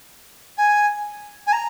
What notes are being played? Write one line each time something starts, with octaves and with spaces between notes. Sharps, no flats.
G#5
G#5
A#5